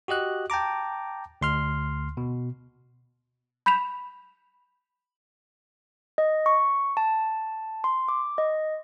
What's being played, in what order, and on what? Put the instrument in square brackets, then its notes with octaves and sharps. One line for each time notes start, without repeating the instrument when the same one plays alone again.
[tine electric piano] F#4 G4 D#5 F#6
G5 A5 A#5 D6
D2 C6 F6
B2
[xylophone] B5 G6 B6 E7 F7
[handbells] D#5
C#6
A5
C6
D6
D#5